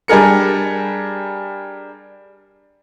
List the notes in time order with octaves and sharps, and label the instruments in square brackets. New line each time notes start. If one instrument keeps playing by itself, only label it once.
[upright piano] G3 D4 G#4 A#4 C#7